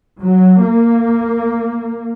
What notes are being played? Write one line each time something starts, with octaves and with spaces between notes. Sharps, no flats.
F#3
A#3